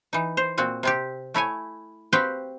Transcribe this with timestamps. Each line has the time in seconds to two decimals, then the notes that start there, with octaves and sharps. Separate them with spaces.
0.13 E3 D#4
0.37 C5
0.58 A#2 C4 F#4
0.83 C3 C4 G4
1.34 A3 E4 C#5 G#5
2.13 C4 F#4 G4 B4 F5 G5